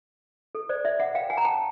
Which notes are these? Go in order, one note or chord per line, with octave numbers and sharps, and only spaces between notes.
A4
C5 D5
D5 E5
E5 F#5
F5 G5
F#5 G#5
A#5
G5 A5